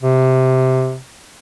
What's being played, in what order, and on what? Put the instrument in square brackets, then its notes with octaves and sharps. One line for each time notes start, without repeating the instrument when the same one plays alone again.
[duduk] C3